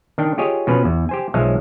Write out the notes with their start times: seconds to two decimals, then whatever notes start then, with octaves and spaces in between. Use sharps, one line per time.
0.18 D#3 D4 G5
0.38 F4 G4 G#4 C#5 D#5
0.67 B2 F3 C#4 B4
0.84 E2
1.09 G4 C5 G#5
1.34 B1 F3 G#3 C#5 E5 A5